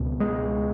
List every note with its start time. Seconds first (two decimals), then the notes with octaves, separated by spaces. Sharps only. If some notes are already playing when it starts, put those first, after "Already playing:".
Already playing: C#2 B2
0.20 G#3